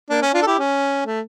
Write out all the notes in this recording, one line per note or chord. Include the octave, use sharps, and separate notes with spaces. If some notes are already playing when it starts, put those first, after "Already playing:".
A#3 D4
C#4
D4 F4
A4
E4 G4
C#4
A3